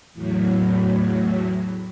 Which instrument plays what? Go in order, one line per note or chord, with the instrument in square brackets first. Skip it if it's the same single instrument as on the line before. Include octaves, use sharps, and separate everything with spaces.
[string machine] E2 A2 F#3